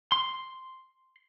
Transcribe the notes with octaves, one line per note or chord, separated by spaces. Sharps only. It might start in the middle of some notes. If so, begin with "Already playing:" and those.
C6